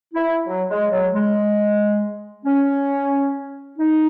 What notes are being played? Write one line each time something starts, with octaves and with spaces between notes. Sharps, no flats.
E4
F#3
G#3
F#3
G#3
C#4
D#4